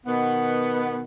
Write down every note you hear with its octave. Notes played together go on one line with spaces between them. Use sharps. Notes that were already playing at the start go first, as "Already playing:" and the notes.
B2 D#3 B3